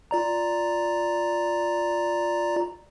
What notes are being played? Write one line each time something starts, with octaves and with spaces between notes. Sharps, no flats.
F4 D5 A#5